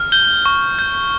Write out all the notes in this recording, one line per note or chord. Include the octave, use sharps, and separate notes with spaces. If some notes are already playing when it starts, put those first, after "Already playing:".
Already playing: F6
G6 G7
C#6
G6